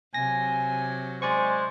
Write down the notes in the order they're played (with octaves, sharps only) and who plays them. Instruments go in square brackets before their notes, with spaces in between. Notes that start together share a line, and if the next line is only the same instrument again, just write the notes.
[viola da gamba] C3 F#3 [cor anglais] G#5 [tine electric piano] A#6
[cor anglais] G#3 [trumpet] C5 [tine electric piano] D5 G#5 C#6